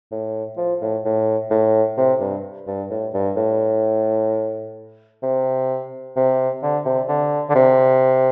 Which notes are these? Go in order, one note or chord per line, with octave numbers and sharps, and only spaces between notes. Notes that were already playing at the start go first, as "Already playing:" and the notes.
A2
F3
A2
A2
A2
C3
G2
G2
A2
G2
A2
C3
C3
D3
C3
D3
D3
C3